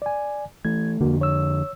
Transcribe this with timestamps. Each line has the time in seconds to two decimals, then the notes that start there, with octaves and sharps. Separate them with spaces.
0.02 D5 G#5
0.65 E3 A3 G#6
1.01 F2 D3 A#3 F#4
1.21 C#5 E6